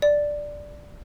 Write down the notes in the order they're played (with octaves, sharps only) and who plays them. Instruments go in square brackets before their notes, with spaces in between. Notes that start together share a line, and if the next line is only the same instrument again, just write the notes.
[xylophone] D5